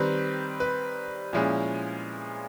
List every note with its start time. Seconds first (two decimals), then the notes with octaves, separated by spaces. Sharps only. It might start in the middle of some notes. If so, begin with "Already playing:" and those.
Already playing: D#3 G3 C4 B4
0.60 B4
1.33 A#2 F3 G#3 C#4 E4